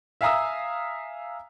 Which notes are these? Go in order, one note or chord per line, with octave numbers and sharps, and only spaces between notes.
E5 F5 G#5 A#5 D#6 E6